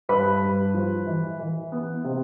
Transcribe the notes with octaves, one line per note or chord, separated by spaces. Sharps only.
G2 B4 B5
G2
F3
E3
E3
B3
C3